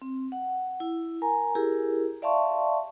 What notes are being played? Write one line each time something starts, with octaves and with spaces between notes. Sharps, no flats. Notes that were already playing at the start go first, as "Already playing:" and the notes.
C4
F#5
E4
A#4 G#5 A#5
E4 G4 G#4 A#4
D5 E5 F5 A5 C6 C#6